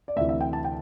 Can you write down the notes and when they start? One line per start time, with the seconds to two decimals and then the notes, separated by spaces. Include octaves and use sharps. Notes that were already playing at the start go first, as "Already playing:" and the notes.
0.08 D5
0.16 D2 C3 E3 E5
0.29 E5
0.41 G5
0.53 A5
0.64 G5